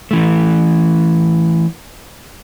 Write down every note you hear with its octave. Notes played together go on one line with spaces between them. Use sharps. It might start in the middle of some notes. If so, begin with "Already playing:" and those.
E3 A3